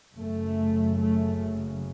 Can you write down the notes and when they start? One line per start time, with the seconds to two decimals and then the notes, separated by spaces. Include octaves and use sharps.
0.16 F#1 F#2 C#3 A3
0.98 A3